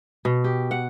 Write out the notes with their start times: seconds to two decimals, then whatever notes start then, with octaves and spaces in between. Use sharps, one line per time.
0.25 B2
0.44 G4
0.71 F#5